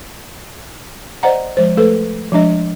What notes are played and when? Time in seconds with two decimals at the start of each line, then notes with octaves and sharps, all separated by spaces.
1.23 C5 D5 D#5 F#5 A#5
1.57 F3 G#3 C5
1.77 A3 A4 B4
2.32 F3 G#3 D4 D#5